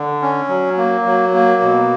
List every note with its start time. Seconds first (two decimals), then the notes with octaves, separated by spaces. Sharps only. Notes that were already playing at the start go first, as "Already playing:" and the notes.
Already playing: D3
0.22 C#4
0.49 F#3
0.78 A#3
1.06 F#3
1.34 A#3
1.62 B2